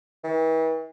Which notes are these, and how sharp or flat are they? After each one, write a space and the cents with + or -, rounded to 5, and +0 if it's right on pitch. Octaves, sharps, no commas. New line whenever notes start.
E3 -40